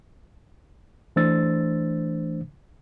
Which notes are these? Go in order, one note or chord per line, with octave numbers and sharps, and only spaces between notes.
E3 A3 D4 C5 E6 A6